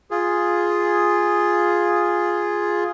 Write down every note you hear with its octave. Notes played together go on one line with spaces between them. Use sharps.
F4 G#4